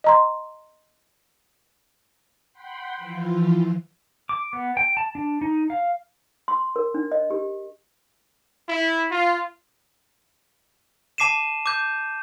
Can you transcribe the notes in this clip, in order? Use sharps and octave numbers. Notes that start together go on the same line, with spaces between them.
D#5 A#5 C6
F#5 G5 B5 C6
E3 F3 E4 F4
D6
B3
G5
A5
D4
D#4
F5
C6
A#4
D4
D#5
G4
E4
F4
A5 D6 C7 D#7 E7
D6 G6